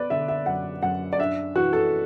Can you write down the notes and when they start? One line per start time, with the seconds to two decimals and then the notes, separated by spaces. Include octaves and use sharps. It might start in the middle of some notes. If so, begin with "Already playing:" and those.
Already playing: B3 B4 D5
0.10 D3 E5
0.28 E5
0.46 F#2 F#5
0.82 F#2 F#5
1.13 D5
1.19 D4 E5
1.55 E3 F#4
1.73 A4